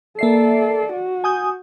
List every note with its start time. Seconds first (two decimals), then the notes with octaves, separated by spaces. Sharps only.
0.19 A#3 A4 D5 E5 C7
0.92 F#4
1.24 G#5 D#6 G6